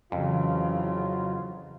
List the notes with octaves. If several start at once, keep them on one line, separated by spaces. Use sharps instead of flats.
F2 C#3 E3 F#3 F4